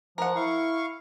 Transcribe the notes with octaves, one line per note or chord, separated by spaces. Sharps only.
F3 A#4 F#5
E4 F5 C#6